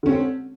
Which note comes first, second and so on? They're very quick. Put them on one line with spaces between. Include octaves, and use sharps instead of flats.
D3 C#4 C4